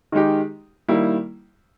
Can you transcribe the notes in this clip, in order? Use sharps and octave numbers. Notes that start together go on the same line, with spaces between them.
D#3 G#3 D#4 G4
D#3 G3 A#3 E4